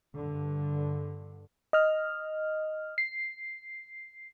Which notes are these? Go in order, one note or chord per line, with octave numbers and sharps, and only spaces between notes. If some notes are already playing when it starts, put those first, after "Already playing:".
G2 D3
D#5 F6
C7